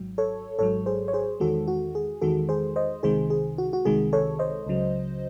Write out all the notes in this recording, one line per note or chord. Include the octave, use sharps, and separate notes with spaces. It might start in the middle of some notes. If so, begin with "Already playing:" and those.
Already playing: G#1 G#2 F#3
A4 C#5
G#1 G#2 F#3 A4 C#5
G#4 C5
C#5
G#4 C5
E2 D#3 G#3 F#4 A4
F#4
G#4
E2 D#3 G#3 F#4 A4
G#4 C5
C5 D#5
C2 C3 D#3 G#3 G#4 C5
G#4
F#4
F#4
C2 C3 D#3 G#3 G#4
A4 C#5
C5 D#5
C#2 C#3 F#3